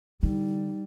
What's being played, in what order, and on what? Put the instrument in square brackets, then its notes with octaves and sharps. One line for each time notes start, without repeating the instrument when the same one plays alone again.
[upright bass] D3 [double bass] G3 [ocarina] D#4